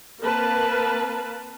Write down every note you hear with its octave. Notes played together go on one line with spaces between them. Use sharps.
A#3 C4 A#4 B4 F5 A5